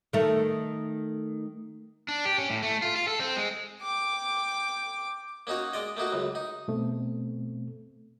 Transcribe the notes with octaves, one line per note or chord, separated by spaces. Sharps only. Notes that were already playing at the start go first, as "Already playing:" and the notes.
D#3 A3
D4
G4
C#4
A2
A3
F4
F4
A4
C4
G#3
G5 D6
A#3 C#4 D#4 F#4 C#5
G#3 D5 D#5
A3 A#3 D#4 F#4
C#2 F#2
D#4
B2 A3 C4